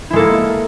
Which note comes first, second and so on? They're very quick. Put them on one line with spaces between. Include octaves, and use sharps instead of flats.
E4 G#3 A4 A#3